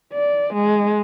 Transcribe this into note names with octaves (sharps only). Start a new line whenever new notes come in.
D5
G#3